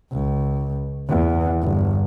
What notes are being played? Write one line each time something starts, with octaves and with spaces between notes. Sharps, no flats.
C#2
E2
G1